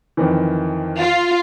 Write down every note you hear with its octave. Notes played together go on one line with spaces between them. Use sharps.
F2 D#3 E3
F4